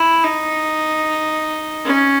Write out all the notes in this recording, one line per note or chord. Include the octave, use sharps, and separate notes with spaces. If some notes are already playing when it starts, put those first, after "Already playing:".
Already playing: E4
D#4
C#4